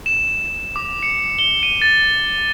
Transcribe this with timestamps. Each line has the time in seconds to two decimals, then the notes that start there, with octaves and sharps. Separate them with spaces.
0.06 E7
0.76 D6
1.03 C#7
1.39 G7
1.63 D#7
1.82 A6